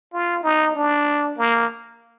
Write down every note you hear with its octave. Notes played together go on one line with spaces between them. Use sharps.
F4
D#4
D4
A#3